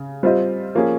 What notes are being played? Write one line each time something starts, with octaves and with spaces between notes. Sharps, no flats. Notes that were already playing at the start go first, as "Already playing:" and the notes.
Already playing: C#3
G3 C4 F4 C5 D#5
F3 A#3 C#4 G#4